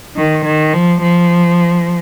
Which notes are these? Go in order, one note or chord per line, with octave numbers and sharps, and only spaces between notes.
D#3
D#3
F3
F3